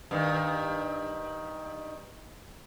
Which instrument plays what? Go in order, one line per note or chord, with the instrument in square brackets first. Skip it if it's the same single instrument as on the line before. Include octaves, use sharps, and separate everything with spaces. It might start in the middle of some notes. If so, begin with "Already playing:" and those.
[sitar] G2 D#3